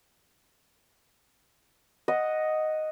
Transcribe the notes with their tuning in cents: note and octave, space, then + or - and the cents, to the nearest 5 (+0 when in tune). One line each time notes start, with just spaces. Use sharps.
D#5 +0 F#5 +0